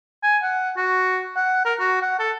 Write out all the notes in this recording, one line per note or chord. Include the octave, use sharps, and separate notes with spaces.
G#5
F#5
F#4
F#5
A#4
F#4
F#5
A4